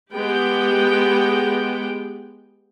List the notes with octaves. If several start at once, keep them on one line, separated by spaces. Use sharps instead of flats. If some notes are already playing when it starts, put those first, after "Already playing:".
G#3 B3 G4 G5